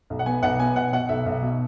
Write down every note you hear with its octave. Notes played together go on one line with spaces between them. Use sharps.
B1
F#5
B3 G#5
B1 F#5
B3 G#5
B2 F#5
B2 F#5
B1 E5
B1
B2